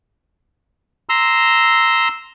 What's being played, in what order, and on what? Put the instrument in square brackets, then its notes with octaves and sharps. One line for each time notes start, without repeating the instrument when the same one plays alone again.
[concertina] A#5 C6 E6